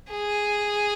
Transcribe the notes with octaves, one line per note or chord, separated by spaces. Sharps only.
G#4